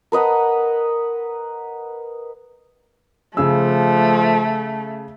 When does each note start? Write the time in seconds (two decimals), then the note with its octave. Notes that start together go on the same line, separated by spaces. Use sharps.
0.12 A#4 B4 D#5 F#5
3.37 C#3 F3 A3 G#4 E6